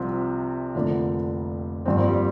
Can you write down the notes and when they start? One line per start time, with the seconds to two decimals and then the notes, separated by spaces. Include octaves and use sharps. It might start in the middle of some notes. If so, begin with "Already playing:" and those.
Already playing: C2 C3 F3 C4
0.75 F1 F2 D3 F3 A#3
1.86 G1 G2 F3 C4
1.97 A#3
2.09 G3